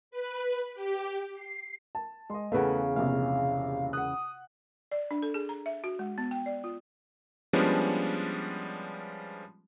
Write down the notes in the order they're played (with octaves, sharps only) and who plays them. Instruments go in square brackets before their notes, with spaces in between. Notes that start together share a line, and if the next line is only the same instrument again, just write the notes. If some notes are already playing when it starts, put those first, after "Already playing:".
[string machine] B4
G4
C7
[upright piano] A5
[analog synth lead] G#3 [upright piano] D#5 C6
[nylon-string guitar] E2 C#3 [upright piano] A3 B4 F#5 [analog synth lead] F5
[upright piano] A#1 C3 [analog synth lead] F5
[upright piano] F#5 F#6 [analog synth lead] D#6
[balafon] D5
D4
A4
G#4
A#5
E5
F#4
G#3
B3
G5
D5
F4
[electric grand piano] F3 G3 G#3 B3 C#4 D4